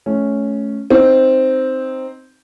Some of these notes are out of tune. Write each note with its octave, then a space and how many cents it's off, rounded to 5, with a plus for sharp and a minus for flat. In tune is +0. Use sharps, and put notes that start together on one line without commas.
A3 -25 C#4 +0
C4 +0 D#4 +0